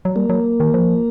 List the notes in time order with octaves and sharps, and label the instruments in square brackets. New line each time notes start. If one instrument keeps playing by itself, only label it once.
[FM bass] F#3
[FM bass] G3 [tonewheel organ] A#3
[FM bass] F#3
D#3
F3